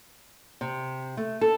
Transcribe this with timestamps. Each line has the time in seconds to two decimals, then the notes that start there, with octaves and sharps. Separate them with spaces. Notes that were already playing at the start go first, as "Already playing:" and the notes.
0.61 C3
1.17 A3
1.41 A4